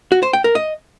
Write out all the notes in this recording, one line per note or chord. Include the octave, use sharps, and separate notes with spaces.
F#4
C5
G5
A#4
D#5